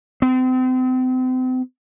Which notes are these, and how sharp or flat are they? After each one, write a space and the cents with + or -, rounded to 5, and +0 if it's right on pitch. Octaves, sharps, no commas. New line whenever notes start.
C4 -35